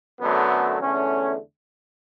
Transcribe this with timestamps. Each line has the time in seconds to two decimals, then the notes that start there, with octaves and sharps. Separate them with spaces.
0.21 F#2 D3 F#3 A3 B3
0.80 E2 D3 A3 C#4